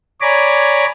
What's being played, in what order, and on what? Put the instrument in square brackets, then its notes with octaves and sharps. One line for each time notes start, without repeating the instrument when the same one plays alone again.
[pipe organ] C#5 D5 G#5 A#5 B5 D6